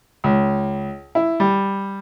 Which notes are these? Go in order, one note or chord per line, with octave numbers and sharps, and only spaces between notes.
C#2
E4
G3